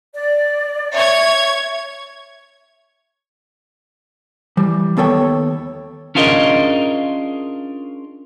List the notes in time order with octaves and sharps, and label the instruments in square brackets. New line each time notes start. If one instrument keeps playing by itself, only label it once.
[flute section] D5
[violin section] C#5 C#6 G#6 [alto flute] E5
[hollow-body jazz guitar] E3 G3
D#2 B3 A4 C#5 G5
[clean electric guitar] C#4 D4 F4 G#4 A#4 D#5